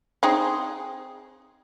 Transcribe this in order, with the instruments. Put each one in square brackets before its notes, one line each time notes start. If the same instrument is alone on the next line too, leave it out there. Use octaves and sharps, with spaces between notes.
[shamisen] C4 D#4 G#4